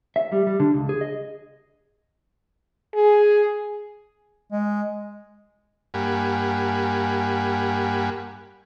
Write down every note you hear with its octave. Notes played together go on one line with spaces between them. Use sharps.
E5
G3
G3
D3
C#2
G#4
D#5
G#4
G#3
G2 A#3 G4 F#5 G#5 B5